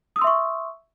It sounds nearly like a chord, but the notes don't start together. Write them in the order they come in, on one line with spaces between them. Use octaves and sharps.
D#6 E6 C6 E5 C#6